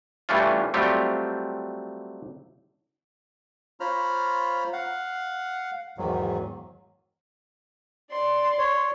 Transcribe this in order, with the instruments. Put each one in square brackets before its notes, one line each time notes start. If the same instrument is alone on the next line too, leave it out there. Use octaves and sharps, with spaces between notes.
[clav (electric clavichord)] E3 G3 A3 C#4 D4 F4
F#3 G3 A3 C4 F4 G4
[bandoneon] F4 C5 C#5 A#5 B5 F6
F5 F#5
E2 G#2 D#3 F#3
[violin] D5 C6
[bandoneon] C#5